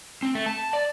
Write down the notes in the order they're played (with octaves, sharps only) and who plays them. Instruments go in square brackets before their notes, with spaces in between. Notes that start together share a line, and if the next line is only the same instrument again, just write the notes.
[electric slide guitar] C4
A3
A5
D5